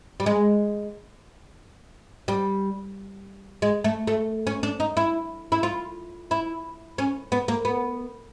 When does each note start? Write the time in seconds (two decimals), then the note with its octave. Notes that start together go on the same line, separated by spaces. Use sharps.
0.20 G3
0.26 G#3
2.28 G3
3.62 G#3
3.84 A3
4.07 A3
4.47 C#4
4.63 D4
4.80 D#4
4.97 E4
5.52 E4
5.63 F4
6.31 E4
6.98 C#4
7.32 B3
7.48 A#3
7.65 B3